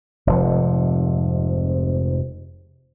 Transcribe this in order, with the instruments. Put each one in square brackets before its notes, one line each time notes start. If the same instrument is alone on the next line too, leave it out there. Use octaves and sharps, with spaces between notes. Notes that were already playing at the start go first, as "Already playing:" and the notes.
[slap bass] F1 G#2 C3 F3